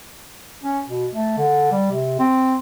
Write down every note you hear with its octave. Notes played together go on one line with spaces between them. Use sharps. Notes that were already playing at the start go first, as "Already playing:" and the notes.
C#4
B2
A3
D3
G3
C3
C4